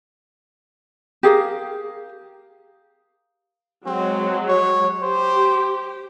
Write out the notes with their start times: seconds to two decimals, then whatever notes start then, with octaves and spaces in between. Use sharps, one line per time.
1.23 G4 G#4 A#4 F5
3.86 F#3 G#3 C4
4.49 C#5
5.02 G4 C5